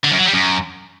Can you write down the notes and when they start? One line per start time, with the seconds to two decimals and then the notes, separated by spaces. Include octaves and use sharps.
0.04 D3
0.12 F#2
0.19 F#3
0.26 G3
0.33 F#2